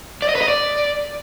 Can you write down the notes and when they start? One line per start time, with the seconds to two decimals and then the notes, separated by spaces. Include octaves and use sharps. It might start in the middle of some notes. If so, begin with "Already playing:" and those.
0.22 D5
0.29 D#5
0.35 B4
0.42 D#5
0.48 D5